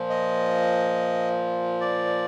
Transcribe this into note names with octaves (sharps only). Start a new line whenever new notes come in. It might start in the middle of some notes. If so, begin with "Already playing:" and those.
Already playing: A#2 F3
D#5
D5